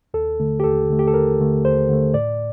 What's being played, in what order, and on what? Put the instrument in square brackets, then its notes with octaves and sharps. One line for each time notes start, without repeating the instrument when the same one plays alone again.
[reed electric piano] D#2 A4
D3 A3
G4
D#2 A4
D3 A3
G4
A4
D#2 A#4
D3 A3
D#2 C5
D3 A3
A2 D5